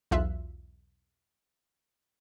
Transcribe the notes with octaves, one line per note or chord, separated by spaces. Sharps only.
B1 E2 F4 E5 F#6